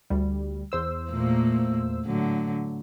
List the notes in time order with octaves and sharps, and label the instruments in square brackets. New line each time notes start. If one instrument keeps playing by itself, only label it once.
[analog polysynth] D2 G3
E2 C5 E6
[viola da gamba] A#2 A3 A#3
A2 D3 F#3